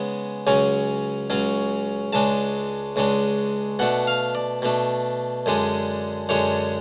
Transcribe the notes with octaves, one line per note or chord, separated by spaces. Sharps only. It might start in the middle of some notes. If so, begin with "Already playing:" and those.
Already playing: C#3 G#3 B3
C#2 C#3 F#3 C#4 G#5
C#2 C#3 F#3 C#4
C#2 C#3 G#3 D4 A5
C#2 C#3 G#3 D4
B2 A3 D4 F#5
F5
D5
B2 A3 D4
F#2 D3 G#3 D4
F#2 D3 G#3 D4 C#5